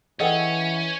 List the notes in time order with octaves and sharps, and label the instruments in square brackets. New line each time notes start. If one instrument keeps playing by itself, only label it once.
[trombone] E3 [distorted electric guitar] C#4 [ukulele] G#4 A4 F#5 [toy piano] D#5 G5